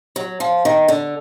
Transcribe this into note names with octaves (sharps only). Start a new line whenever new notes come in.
F#3
F3
D#3
D3